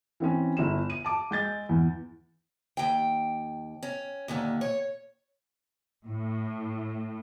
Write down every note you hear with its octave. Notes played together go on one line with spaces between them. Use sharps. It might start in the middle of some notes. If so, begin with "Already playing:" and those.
E3 C4 C#4
G1 E4 E7
D#7
A5 D6
G#3 G6 A6
E2
D#2 G5
C#4
D#2 A#2 D3
C#5
A2